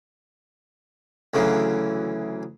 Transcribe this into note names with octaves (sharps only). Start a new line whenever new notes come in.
D2 C#3 E3 F#3